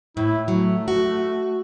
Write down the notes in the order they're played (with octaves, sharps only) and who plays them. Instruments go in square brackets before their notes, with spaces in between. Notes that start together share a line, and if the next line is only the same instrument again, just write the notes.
[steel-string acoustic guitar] A2 [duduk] E4
[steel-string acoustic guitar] F#3 [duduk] A3
[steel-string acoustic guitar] F#4